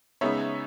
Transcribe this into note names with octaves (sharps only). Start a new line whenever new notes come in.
C#3 G#3 B3 D#4 C#5 E5